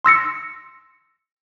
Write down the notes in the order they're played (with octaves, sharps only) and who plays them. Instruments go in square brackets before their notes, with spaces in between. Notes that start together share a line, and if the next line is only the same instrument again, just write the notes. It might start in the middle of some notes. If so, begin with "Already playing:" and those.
[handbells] C6 E6 A#6 C#7